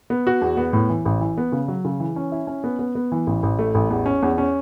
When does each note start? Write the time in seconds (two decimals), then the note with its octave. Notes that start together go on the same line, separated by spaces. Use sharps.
0.10 B3
0.27 F#4
0.42 E2
0.57 B3
0.73 A2
0.89 E3
1.05 A1
1.21 E3
1.38 B3
1.52 C#3
1.68 F#3
1.85 C#3
2.00 E3
2.16 C#4
2.32 E4
2.47 C#4
2.64 B3
2.79 B3
2.95 B3
3.12 E3
3.27 A1
3.43 A1
3.59 A3
3.75 A1
3.90 E2
4.06 C#4
4.23 E2
4.38 C#4